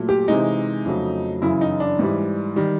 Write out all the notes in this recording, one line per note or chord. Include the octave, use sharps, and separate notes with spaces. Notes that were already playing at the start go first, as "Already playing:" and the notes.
Already playing: A#2 F#3 A3
G4
C3 E3 G#3 D#4
F2 C#3 F#3 A3
F#2 C#3 E3 E4
D#4
D4
G#2 E3 G3
D#3 G3